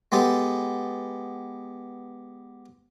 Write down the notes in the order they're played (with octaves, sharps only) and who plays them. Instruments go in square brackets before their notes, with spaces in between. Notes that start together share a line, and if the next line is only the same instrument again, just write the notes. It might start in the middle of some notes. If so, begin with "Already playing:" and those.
[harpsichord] G#3 B3 G4 A4